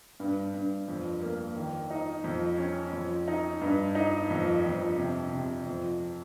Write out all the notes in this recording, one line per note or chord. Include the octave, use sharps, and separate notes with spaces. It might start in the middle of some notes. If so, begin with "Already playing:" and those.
G2
G2
F2
A#3
D#3
D#4
F2
C#4
F2
D#4
G2
D#4
F2
F2
C3
C3
F2